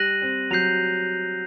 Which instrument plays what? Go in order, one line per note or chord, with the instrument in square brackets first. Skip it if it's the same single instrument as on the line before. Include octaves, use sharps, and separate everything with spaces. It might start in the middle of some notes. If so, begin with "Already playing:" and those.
Already playing: [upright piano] G3 [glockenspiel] F#6 A#6 D#7 F#7
[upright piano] C4
[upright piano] F#3 [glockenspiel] G6 C7 F7